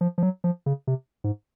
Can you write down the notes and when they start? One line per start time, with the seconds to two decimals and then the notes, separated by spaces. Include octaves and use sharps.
0.01 F3
0.18 F3
0.23 F#3
0.44 F3
0.66 C#3
0.87 C3
1.24 G#2